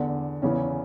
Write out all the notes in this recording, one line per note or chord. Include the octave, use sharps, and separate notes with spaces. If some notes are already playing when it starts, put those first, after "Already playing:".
Already playing: E2 D3
E2 C#3 E3 C#4